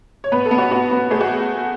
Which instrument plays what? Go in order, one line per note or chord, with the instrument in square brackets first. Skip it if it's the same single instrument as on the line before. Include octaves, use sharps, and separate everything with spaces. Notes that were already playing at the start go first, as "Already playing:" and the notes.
[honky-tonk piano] C#5
B3 B4
A4
B3
F#4
B3 F#4
B3
A3 G#4
F#4